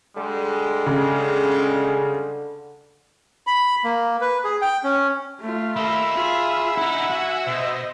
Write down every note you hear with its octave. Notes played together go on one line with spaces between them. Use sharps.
D3 G3 G#3
C#3
B5
A#3
B4
G#4
G5
C#4
A3 F4
A#3 D#5 E5 B5
F4 G#4
D#4 E4 F#5 G#5
F#4
B2 C5 D#5